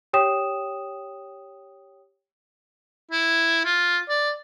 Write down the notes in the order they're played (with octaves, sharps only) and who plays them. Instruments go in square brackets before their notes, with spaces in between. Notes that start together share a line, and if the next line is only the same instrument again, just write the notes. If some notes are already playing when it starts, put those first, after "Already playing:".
[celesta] G4 C#5 G5 D#6 E7
[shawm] E4
F4
D5